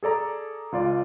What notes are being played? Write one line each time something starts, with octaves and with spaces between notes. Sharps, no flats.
G#4 A4 D5 A#5
C#2 F4 D5